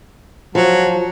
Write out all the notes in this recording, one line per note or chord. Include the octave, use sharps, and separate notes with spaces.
F3 F#3